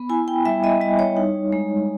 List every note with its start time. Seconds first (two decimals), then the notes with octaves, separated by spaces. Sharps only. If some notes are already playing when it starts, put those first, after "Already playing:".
Already playing: B3 B5
0.09 E4 G#5
0.28 G5
0.45 G3 E5
0.64 D#5
0.81 G3 D#5
0.99 C#5
1.17 D#4
1.53 G#3